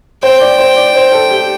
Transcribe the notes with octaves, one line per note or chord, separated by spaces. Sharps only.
C5 G5
D5
C5
D5
C5
A4
G4